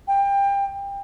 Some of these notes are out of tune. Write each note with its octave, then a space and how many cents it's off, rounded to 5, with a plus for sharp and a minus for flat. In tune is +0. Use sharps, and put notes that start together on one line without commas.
G5 +25